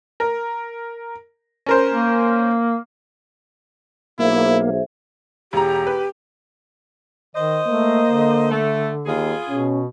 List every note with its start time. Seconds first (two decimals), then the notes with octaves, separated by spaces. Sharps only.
0.20 A#4
1.66 C#4 A#4 C5
1.91 A#3
4.19 B1 A#3 E4 G#4 C5 E5
5.53 E1 G4 A#5
5.87 B4
7.35 D#3 C5 D#5
7.68 A3 A#3
8.07 D3
8.51 A3
9.06 D#2 B3 F4 G#4
9.49 B2 C#4